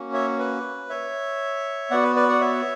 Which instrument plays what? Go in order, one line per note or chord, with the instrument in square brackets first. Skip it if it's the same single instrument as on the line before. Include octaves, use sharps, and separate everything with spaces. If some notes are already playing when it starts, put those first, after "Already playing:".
Already playing: [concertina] A#3 C#4 F#4
C#5 E5
B4
C#5 E5
B3 F#4 D5 F#5
B4
B4 D5
D5 F#5
C#5 E5